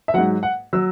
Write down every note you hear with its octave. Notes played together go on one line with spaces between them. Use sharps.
E5
G#2 F#3 F#5
F#5
F#3 E6